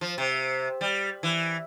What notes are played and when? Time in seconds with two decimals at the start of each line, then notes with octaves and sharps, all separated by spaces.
0.01 F3
0.18 C3
0.81 G3
1.23 E3